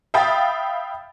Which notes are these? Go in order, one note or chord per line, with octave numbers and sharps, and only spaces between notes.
E5 F5 G5 B5 D#6 A6